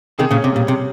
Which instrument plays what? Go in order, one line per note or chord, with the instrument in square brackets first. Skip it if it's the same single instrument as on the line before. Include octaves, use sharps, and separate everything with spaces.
[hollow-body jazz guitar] C3 D#3 [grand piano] G#4
[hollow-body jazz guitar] A#2 C#3
[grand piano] C#4
[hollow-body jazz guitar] C3
[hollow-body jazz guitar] A#2 [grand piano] G3
[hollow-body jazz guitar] C3